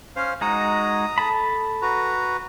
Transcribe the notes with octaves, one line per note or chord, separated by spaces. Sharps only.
C#4 C5 F5
G#3 D#4 F#4 A#5 D#6
A4 A5 B5
F#4 B4 A#5